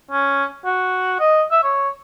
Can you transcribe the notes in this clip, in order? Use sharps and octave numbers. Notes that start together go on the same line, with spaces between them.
C#4
F#4
D#5
E5
C#5